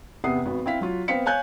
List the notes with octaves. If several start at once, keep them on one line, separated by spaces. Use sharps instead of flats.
E2 C3 B3 F#5 D#6 C7
G#1 B3 F#4
C4 E4 F5 B6
F#3 F4
B3 C4 C5 F5 B6 C#7
C#5 F5 G#5 F#6 G6